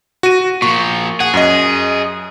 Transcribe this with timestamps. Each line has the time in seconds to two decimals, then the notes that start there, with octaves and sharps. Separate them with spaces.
0.23 F#4 D#7
0.62 A#2 F3 C#6
1.20 G#4 F#5
1.34 F#2 D#5